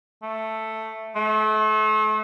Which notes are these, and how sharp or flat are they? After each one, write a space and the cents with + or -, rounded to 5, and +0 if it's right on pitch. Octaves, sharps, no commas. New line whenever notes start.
A3 +5
A3 -35